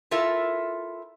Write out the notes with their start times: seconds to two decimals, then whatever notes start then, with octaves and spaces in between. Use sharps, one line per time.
0.11 E4 F4 A4 A#4 E5